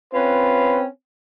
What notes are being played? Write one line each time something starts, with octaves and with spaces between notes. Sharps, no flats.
C4 C#4 F4 B4